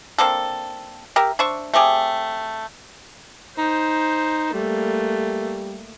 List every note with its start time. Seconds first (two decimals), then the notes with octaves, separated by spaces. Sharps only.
0.18 A#3 C4 D4 A4
1.16 G4 A#4 E5
1.39 D4 C5 E5 C#6
1.74 A3 C4 G4 G#4
3.58 D#4 C5
4.53 G3 A3 A#3